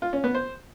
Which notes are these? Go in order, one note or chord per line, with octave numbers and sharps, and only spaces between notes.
F4
C#4
B3
C5